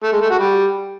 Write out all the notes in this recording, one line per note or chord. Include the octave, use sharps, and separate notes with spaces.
A3
G#3
A3
F#4
G3